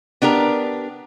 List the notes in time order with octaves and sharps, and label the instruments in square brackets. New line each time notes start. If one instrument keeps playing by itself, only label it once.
[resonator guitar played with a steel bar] B3 D4 G4 A#4